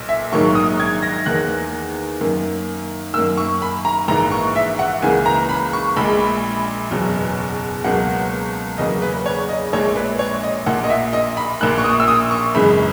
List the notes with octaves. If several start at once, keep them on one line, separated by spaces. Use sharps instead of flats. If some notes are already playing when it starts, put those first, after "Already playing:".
Already playing: B1 A#2
E5
A#1 G#2 D#3 F#3 A#3 C#6
D#6
G#6
A#6
E2 D#3 A#3 F#6
F#2 D#3 A#3
F#2 D#3 A#3 E6
C#6
B5
A#5
A#1 G#2 E3 A#3 A#5
C#6
E5
F#5
C#2 C#3 E3 A#3 G#5
A#5
B5
C#6
A#1 A#2 G#3 B5
F#1 E2 B2 F#3
C#2 B2 F#3 A#3 F#5
E2 C#3 F#3 A#3 D#5
B4
C#5
D#5
A#1 A#2 G#3 C#5
B4
C#5
D#5
A#1 A#2 A#3 F#5
D#5
E5
D#5
B5
A#1 A#2 A#3 F#6
C#6
D#6
E6
D#6
C#6
G#1 F#2 C#3 E3 G#3 B5